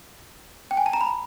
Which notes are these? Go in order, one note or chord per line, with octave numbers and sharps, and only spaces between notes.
G5
G#5
A5
A#5
B5